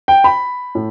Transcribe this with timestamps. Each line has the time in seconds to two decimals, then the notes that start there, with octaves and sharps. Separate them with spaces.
0.08 G5
0.24 B5
0.75 A2